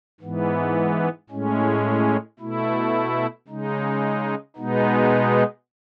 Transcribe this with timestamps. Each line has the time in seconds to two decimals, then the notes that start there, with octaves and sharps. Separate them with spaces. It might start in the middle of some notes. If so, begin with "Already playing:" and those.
0.21 G#2 E3 B3
1.30 A2 G#3 C#4
2.39 B2 A3 E4
3.48 C#3 G#3 D#4
4.56 B2 G#3 B3 D#4